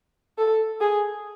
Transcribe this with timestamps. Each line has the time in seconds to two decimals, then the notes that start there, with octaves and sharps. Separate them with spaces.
0.38 A4
0.81 G#4